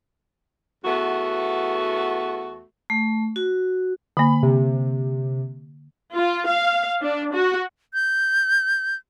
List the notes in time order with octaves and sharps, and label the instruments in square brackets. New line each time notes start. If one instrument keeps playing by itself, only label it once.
[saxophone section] E2 A3 B3 F#4
[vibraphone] A3
F#4
[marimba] D3 A#3 [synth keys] B5
[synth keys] C3
[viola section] F4
F5
D4
F#4
[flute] G6